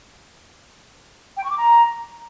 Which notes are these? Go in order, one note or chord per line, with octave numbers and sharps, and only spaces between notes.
G5
C#6
D6
A#5